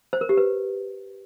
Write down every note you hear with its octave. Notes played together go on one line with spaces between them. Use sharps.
C5
A#4
G4
B4